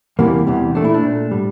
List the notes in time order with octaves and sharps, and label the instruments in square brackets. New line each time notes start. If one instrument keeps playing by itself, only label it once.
[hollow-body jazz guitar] E2 C3 E3 G3 A#3
E2 C3 E3 G3
A#2 A3 D4
E4
D4
A#2 A3
A2 G3